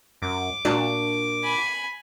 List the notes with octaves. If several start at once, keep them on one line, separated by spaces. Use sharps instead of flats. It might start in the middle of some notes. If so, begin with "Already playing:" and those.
F#2 D6
A#2 D4 F#4
G#5 B5